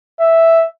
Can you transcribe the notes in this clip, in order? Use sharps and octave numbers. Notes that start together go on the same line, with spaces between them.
E5